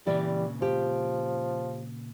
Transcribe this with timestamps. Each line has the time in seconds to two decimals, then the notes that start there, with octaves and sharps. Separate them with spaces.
0.07 A#2 C#3 E3 G3 D5
0.62 F3 G4